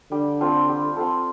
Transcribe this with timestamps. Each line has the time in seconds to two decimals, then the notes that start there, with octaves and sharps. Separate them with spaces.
0.12 D3 G3
0.41 C4 F4 A4
0.68 G3
0.96 C4 F4 A4